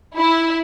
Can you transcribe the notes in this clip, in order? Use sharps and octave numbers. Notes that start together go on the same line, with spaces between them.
E4